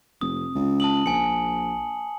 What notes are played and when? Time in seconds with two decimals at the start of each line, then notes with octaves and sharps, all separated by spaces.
0.21 F1 D#6
0.55 C#2
0.80 A5 D#6 F#7
1.06 A#1 G#5 C#7